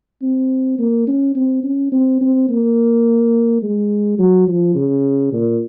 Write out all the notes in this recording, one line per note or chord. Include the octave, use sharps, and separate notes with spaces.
C4
A#3
C#4
C4
C#4
C4
C4
A#3
G#3
F#3
F3
C#3
A#2